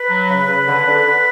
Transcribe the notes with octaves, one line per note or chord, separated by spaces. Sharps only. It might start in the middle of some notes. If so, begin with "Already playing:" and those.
Already playing: B4
F#3
C#3
C#3
D3
D3
D3